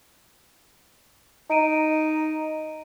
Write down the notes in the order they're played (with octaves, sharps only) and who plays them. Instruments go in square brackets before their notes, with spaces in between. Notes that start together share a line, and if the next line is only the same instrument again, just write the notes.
[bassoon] D#4 [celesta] A#5 D7 D#7